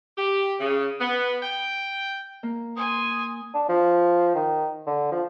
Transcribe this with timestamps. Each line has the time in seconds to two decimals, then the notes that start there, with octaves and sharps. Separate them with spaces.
0.18 G4
0.60 C#3
1.01 B3
1.43 G5
2.43 A#3
2.77 G#5 C6 D#6
3.54 D4
3.69 F3
4.35 D#3
4.87 D3
5.12 F3